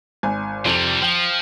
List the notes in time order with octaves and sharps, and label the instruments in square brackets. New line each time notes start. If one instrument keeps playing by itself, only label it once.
[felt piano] G#1 G#5
[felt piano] F2 [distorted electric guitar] C3 G3
[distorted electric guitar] F3 [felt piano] G5